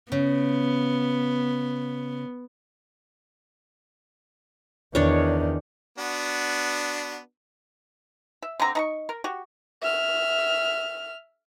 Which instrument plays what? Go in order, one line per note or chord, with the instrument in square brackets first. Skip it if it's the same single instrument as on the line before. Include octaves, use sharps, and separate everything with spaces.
[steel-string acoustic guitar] C#3 [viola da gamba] B3
[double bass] E2 D#3 [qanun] D4 C#5
[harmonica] B3 D4 F#4
[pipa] E5
D3 C4 A#5
D#4 A#5 C#6
A#4
F#4 G4
[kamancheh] E5 F6